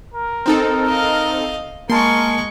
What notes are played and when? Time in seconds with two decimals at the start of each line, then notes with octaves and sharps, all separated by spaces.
0.14 A#4
0.46 C4 D#4 A4
0.87 D#5 F5
1.90 G#3 A#3 A#4 A5 C6 C#6